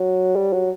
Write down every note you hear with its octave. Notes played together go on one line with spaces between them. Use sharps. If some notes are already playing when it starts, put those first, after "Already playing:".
Already playing: F#3
G3
F#3